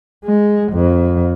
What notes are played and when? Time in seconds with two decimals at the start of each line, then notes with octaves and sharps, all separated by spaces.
0.25 G#3
0.72 F2